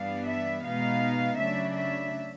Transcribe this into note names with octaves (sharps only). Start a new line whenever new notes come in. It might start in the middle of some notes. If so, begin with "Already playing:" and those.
Already playing: G2 E3 G3 B3 D4 F5
E5
B2 G#3 B3 D#4 F5
C#3 F#3 A3 D4 E5
E5